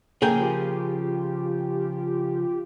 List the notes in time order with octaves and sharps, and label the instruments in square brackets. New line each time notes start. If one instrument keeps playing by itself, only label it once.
[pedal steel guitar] C#3 F3 [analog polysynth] A#3 [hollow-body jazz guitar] G#4 A#4 G5
[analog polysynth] F4 G4